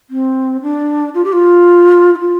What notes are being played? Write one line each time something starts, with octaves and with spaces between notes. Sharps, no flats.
C4
D4
F4
G4
F4
E4
F4